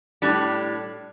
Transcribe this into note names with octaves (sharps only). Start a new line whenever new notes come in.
A2 G3 D4